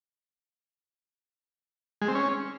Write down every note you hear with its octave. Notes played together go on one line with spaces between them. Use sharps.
G#3
C4
C#4